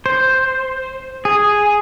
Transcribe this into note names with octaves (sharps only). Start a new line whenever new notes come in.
C5
G#4